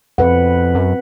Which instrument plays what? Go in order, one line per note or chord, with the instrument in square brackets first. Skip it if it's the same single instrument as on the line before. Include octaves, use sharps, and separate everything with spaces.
[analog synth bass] F2 [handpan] C4 B4 F#5
[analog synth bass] F#2